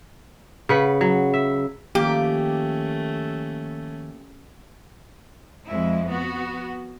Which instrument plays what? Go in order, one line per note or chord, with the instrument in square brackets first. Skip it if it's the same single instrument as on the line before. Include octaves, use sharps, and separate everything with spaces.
[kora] C#3 B4 F#5
F#3
E5
[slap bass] D#3 F3 [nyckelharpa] A3 C#4 [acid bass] A#3 [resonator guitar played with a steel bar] G4
[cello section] F2 G#3 E4
B3 F#4